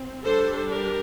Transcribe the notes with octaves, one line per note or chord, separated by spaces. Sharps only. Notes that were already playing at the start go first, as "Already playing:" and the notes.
Already playing: C4
G3 D4 A4 C5
G4 A#4